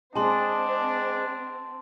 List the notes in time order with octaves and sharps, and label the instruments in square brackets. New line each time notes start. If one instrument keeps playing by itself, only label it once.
[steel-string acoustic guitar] G#3 G#4 [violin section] C4 [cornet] D4 [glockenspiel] A5 C6